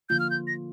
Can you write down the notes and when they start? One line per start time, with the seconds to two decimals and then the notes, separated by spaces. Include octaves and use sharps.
0.09 D3 F3 A#3 F4 G6
0.20 F6
0.30 G6
0.47 A#6